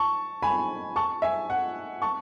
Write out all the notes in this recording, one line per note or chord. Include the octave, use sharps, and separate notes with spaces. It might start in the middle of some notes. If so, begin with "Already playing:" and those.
Already playing: A5 C#6
G#5 B5
A5 C#6
E5 G#5
F#5
A5 C#6